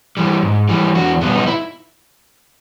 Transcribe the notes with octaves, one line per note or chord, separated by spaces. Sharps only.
E3 G3
G#2
E3 G3
E2 F#4
B2 G3 B3
D#4
E4